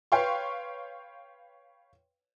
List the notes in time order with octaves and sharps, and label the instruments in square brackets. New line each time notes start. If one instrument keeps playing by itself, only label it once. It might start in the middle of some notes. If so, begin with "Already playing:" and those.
[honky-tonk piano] B4 C#5 F5 G5 C6 C#6